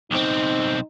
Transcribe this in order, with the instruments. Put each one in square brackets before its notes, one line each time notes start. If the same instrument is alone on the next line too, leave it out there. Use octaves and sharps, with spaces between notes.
[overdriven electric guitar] B1 C4 [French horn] D#4